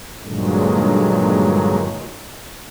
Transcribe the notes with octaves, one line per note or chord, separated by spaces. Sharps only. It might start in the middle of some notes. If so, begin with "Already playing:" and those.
G2 A#2 D3 D#3 F#3 G#3